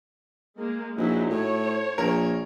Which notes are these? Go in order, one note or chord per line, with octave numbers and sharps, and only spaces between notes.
G#3 A#3
A#1 F#3 D#4 E4
A2 C#5
A#1 A#4